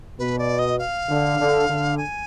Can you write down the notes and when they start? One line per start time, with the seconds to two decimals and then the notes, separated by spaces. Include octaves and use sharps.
0.19 B2 B4
0.39 D5
0.59 D#5
0.79 F5
1.09 D3
1.38 D3
1.68 D3
1.98 G#5